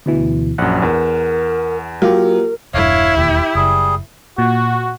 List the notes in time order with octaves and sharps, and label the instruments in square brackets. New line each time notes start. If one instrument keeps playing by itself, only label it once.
[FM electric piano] D2 B2 E3
[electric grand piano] A#1 F#2 [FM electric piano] F#5
[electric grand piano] E2 [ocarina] A#4
[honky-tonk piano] F#3 [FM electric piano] A#3 F4 G4 [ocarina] A#4
[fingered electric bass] E1 G2 [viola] E4 [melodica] C#5 F5
[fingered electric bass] E1 D#2 [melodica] G4
[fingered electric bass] F#1 [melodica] G3 G#4
[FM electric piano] A#2 [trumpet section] F#4